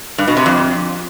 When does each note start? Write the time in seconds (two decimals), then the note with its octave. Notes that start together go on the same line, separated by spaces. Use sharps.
0.18 G2
0.27 B2
0.37 C3
0.46 F2